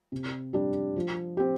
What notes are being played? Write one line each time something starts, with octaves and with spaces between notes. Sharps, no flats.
C3
G3 D4 G4
F3
C4 G4